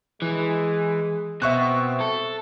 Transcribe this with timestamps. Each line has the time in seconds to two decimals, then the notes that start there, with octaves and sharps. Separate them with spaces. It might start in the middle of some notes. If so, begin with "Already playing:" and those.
0.22 E3 G#3
1.42 B2 C4 E5 C#6 F#6
2.01 A4